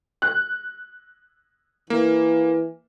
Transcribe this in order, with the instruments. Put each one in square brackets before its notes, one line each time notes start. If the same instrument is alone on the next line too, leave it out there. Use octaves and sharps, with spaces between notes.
[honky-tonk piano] F#6
[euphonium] E3 [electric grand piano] A#3